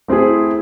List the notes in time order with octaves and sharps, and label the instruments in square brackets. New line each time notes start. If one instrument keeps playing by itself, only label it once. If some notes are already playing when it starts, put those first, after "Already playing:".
[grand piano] A3 C4 E4 G#4